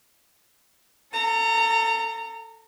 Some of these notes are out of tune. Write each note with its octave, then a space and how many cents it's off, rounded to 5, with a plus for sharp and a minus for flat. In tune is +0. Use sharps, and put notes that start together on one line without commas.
A4 +15 A#5 -20